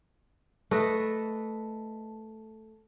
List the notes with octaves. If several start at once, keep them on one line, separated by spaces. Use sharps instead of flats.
A3 A4 B4 D#5